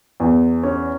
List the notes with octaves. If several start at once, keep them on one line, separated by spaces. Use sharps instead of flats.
E2
C#4